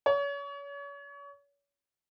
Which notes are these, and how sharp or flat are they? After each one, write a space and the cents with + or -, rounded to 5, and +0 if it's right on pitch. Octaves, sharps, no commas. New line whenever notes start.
C#5 +35